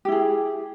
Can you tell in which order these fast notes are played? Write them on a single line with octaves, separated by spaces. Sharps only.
G4 E4 G#4